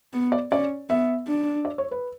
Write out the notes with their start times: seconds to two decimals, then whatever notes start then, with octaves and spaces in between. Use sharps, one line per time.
0.13 B3
0.32 D5
0.51 C#4 D5
0.89 B3 E5
1.27 D4
1.65 D5
1.78 C#5
1.91 B4